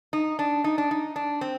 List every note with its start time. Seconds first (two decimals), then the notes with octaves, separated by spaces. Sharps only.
0.13 D#4
0.39 D4
0.64 D#4
0.78 D4
0.91 D#4
1.16 D4
1.41 C4